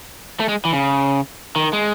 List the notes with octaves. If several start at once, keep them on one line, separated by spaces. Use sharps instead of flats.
A3
G#3
E3
C#3
D#3
G#3